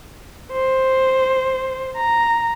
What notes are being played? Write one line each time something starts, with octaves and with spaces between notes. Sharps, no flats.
C5
A#5